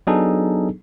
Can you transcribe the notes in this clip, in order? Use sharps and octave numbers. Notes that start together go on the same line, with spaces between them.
F#3 B3 D4 D#4 G#4 A4